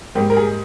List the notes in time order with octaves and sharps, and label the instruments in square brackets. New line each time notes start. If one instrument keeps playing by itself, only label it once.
[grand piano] G#2 G3 A#3 G4
A#4
G#4